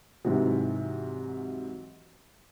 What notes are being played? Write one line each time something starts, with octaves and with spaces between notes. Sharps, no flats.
G#2 C3 E3 F#3